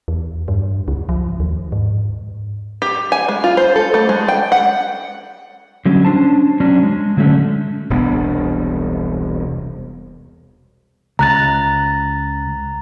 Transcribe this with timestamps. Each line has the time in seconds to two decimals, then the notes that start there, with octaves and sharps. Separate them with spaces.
0.08 E2
0.48 G2
0.88 C#2
1.09 F3
1.40 D#2
1.72 G#2
2.82 G4
3.12 G#5
3.28 G#3
3.44 F4
3.57 C5
3.76 A4
3.94 A3
4.09 G#3
4.28 G5
4.52 F#5
5.86 D3 F#3 G3 C#4
6.05 C#4 D4 C5 A5
6.60 F#3 C#4 D4
6.83 G#3
7.17 D3 F#3 G#3 A3 C#4 D4
7.90 E1 C2 B3 D4
11.19 C#2 A#5 F#6 A6